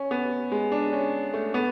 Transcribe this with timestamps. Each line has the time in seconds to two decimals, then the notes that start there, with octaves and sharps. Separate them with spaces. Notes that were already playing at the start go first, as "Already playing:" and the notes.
Already playing: C#4
0.11 B3
0.52 G#3
0.72 D4
0.93 C#4
1.34 A3
1.54 B3